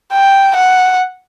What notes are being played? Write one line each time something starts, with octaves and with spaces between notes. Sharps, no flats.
G5
F#5